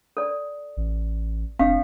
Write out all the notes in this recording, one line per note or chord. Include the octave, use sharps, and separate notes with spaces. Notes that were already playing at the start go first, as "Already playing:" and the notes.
A4 D5
A1
F1 C4 D4 F5